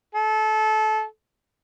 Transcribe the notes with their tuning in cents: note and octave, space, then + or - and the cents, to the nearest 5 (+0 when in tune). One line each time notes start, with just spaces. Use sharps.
A4 -25